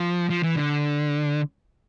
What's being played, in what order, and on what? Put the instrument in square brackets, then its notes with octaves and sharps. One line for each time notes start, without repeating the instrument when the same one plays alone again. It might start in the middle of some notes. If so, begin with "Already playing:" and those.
Already playing: [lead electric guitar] F3
F3
E3
D3